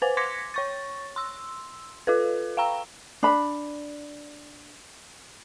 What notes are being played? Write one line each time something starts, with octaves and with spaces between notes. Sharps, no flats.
B4 C5 G#5
C6 D6 G#6 A#6 B6 C#7
C#5 C#6 A6
C6 E6
F4 A4 B4
F5 G5 A#5 E6
D4 B5